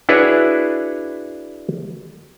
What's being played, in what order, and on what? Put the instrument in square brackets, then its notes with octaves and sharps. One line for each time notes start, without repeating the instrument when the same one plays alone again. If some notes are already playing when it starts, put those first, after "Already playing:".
[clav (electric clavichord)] D4 E4 F#4 G#4 B4 C#5